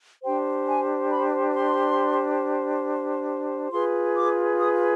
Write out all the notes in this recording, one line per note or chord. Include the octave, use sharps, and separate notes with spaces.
D4 G4 C5 G5
G#5
B5
C6
F4 G#4 B4 C6
D6
D#6